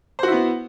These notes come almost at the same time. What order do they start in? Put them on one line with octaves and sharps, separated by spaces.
C5 F#4 E4 B3